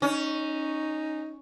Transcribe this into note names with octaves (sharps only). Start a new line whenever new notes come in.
C#4 D#4